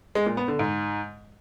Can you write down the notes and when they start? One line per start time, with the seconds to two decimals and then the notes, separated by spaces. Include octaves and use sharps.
0.15 G#3
0.26 A#2
0.37 B3
0.48 D3
0.59 G#2